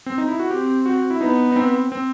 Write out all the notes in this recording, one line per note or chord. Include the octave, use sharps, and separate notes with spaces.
C4
D#4
E4
F#4
C4 G4
F#4
E4
B3 D#4
D#4
C4
C4